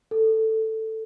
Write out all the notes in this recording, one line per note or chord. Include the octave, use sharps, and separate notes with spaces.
A4